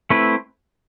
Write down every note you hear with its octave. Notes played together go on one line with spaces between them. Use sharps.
A3 C4 E4 B4